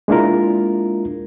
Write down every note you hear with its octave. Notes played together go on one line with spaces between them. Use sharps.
G#3 A#3 D4 E4 F4 A#4